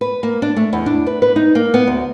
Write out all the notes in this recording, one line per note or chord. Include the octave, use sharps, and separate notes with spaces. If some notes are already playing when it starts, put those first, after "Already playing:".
B4
A#3
D4
A3
E2
D4
B4
B4
D#4
A#3
B3
D2